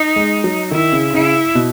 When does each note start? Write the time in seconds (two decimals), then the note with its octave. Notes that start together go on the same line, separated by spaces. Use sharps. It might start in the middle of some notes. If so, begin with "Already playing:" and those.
Already playing: D#4
0.16 G#3
0.44 F#3
0.71 D#3 E4
0.92 C#3
1.13 C#3 E4
1.55 B2